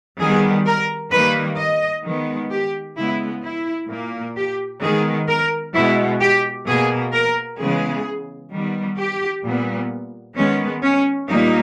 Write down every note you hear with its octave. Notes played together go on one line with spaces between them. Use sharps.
D#3 G3 B3 G#4
A#4
D#3 G3 A#3 B4
D#5
D#3 G#3 B3
G4
C#3 G#3 B3 E4
E4
A#2 A#3
G4
D#3 G#3 B3 G#4
A#4
B2 G#3 B3 E4
G4
B2 A#3 G#4
A#4
C#3 E3 G#3 B3 G#4
D#3 G3 B3
G4
A#2 G3 B3
D#3 G#3 B3 C#4
C#4
A#2 G3 A#3 D#4